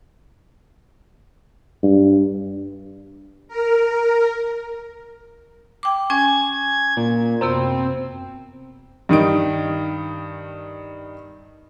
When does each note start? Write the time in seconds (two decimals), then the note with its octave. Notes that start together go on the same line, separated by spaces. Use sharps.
1.83 G2
3.48 A#4
5.83 G5 D6
6.10 C#4 G#5 G#6
6.97 A#2
7.41 F#2 C3 B3 C4
9.09 G2 D#3 D#4 D7